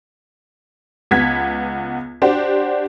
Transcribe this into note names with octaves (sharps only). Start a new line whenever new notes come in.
C#2 B3 G#6 B6
D4 F#4 G4 C5